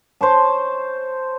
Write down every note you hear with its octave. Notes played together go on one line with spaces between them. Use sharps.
C5 C#5 A5